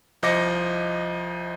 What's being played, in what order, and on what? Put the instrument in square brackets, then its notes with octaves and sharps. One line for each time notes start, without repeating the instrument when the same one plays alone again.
[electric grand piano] C2 F3 D#5 D6 A#6 C#7